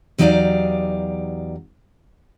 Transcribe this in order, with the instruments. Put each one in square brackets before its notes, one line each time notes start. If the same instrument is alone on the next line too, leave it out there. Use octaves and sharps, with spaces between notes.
[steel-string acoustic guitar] E2 F#3 D#4 G4 D5 F5